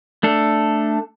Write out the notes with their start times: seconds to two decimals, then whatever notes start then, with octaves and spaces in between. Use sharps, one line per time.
0.23 A3 D4 A4